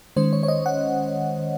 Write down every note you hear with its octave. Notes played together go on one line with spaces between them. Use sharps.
D#3 G#3 C#4 C5
C#5
C#5
D#5
F#5